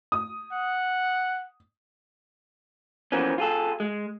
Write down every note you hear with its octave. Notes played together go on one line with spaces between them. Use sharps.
D#6
F#5
E3 F3 A#3 B3 C#4
F4 G#4 A4
G#3